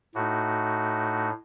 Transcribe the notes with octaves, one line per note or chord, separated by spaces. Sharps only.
A2 A3 D#4 F#4